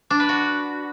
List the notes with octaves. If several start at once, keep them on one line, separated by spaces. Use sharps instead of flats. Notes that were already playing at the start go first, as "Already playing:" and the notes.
D4
B4
F#4